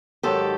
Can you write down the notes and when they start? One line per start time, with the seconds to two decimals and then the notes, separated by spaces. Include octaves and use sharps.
0.23 G#2 D#3 F#3 G4 A4